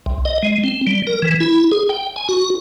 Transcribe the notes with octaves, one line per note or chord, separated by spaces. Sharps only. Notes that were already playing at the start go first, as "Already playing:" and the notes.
C2
D#5
G#3
C4
G3
A#4
E3
E4
G#4
G5
G#5
F#4